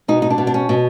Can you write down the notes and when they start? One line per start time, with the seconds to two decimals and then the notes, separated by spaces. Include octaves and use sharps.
0.08 B2 D#4
0.22 D#4
0.30 D4
0.38 B2
0.47 D4
0.54 C#4
0.69 B2